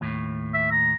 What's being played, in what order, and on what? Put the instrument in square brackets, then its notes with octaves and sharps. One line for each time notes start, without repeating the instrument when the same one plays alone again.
[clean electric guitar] D#2 A2
[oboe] E5
A#5